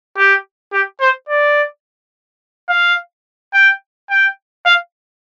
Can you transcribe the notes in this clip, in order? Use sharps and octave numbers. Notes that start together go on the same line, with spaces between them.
G4
G4
C5
D5
F5
G5
G5
F5